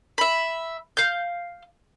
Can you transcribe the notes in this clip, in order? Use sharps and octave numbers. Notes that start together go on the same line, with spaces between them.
E5 B5
F5 G6